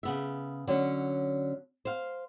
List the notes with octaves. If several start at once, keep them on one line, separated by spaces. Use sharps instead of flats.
C#3 B3 E5
D3 F#3 C#4
C5 F5